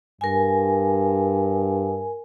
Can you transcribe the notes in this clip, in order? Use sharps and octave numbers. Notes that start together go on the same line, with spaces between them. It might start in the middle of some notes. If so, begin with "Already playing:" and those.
G2 A#4 G#5